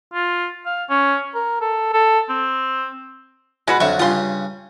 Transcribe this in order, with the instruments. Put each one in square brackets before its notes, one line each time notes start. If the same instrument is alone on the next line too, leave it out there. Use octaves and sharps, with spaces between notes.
[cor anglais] F4
F5
C#4
A#4
A4
A4
C4
[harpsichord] B2 [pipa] G#3 F#4 B4
[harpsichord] F2 D3 F#3 [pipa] E5 C#6
[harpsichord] G2 C#3 D#6 [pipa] F4 C6